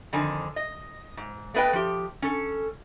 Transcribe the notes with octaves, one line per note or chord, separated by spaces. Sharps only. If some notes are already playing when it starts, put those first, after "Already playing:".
F2 D3 D#3 G#5
D#5
G#2
A3 B3 B4 D#5 G5
F3 G4
C#4 A4